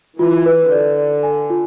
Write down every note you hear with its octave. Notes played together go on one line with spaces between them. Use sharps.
E3 F4
B4
D3 D5
D5
G#5
F4